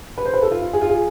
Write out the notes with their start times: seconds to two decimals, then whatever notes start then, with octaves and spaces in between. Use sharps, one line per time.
0.18 B4
0.25 C5
0.34 B4
0.42 A4
0.51 F4
0.61 F4
0.73 G#4
0.81 F4
0.89 G#4